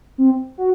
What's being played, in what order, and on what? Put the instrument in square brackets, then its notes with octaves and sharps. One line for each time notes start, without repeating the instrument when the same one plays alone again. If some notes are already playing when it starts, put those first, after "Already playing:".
[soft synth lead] C4
F#4